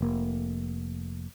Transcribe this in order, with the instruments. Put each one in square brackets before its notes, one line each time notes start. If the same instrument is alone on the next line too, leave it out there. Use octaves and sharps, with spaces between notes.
[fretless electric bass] F1 A#3